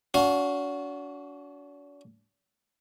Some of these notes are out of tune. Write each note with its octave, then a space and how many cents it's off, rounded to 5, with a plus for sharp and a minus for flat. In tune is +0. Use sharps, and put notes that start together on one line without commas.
D4 -45 F#4 +0 F5 +5